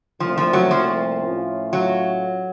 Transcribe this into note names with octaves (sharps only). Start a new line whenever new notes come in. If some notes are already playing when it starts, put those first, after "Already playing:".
C2 A#2 F3 A3 C4
F3
F#3
F3
A2 A3 C#4 F4
F#3